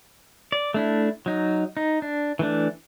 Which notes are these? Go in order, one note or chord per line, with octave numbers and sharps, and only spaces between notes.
D5
A3 D4 E4
F#3 D#4
D#4
D4
E3 A3 D4